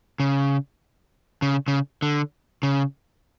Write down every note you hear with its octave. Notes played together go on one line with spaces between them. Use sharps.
C#3
C#3
C#3
D3
C#3